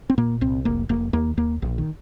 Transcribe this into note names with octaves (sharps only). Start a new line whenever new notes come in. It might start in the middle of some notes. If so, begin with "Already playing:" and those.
C4
A#2 A#3
C2 C4
F1 A#3
F1 A#3
D#2 A#3
D#2 A#3
A#1
D#3